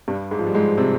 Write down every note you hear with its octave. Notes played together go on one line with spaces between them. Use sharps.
G2 G3
G#2 G#3
F3
G3
G#2 G#3
C3 C4